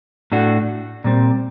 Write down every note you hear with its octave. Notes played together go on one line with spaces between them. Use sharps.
A2 A3 D4 F#4
A#2 G3 C4